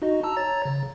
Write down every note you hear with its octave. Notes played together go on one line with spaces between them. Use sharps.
D#4 F#4 D#5
A5 A#5 E6
C#5 A#5 A6
C#3